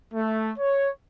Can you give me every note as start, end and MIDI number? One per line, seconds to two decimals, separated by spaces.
0.14 0.52 57
0.58 0.89 73